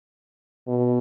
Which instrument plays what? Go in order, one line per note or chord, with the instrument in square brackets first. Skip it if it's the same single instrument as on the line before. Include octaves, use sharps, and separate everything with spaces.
[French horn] B2